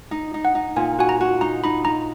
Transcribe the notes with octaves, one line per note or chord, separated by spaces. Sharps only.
D#4
D#4
F#5
D#4
A#2 G#5
F#4 G#5
A#5
F#4
D#4 A#5
D#4 B5
D#4 A#5